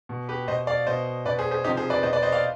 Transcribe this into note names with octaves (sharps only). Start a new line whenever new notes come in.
B2
G4 B4
B2 C5 D#5
D5 F5
B2 C5 D#5
B2 B4 D5
G#4 C5
G#4 C5
C3 F3 D#4 G4
G#4 C5
B4 D5
B2 C5 D#5
B4 D5
C5 D#5
D5 F5